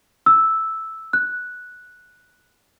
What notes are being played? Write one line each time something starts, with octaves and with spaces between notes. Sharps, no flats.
E6
F#6